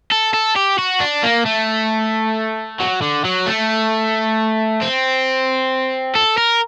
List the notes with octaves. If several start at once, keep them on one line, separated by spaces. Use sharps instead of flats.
A4
A4
G4
F#4
D4
A#3
A3
F#3
D3
F#3
A3
C4
A4
A#4